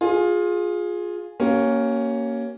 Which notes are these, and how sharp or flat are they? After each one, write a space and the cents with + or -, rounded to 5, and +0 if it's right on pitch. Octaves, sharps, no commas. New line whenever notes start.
F4 +20 G#4 +0
A#3 +0 C#4 +5 G4 -45